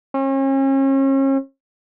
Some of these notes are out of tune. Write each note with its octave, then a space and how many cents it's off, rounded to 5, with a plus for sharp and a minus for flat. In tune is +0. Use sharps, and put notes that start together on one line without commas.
C#4 -40